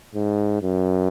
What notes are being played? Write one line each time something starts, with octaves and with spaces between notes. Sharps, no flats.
G#2
F#2